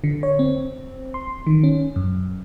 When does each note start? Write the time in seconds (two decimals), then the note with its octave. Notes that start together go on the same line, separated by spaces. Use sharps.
0.04 D3
0.23 C#5
0.39 C4
1.14 C6
1.47 D#3
1.64 C#4
1.96 F#2